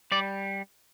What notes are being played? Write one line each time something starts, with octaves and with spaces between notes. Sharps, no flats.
G3 D5